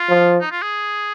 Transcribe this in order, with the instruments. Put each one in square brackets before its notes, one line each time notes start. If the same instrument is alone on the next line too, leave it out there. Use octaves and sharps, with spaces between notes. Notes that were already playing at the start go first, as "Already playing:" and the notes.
Already playing: [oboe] F4
[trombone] F3
[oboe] D#4
F4
G#4